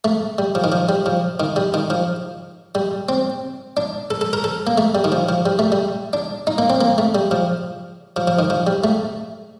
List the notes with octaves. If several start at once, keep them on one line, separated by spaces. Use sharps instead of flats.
A3
G3
F3
D#3
F3
G3
F3
D#3
G3
D#3
F3
G3
C4
D4
A4
A4
A#4
A4
A#3
A3
G3
D#3
F3
F3
G3
A3
G3
D4
D#4
A#3
C4
A#3
A3
G3
F3
F3
F3
D#3
F3
G3
A3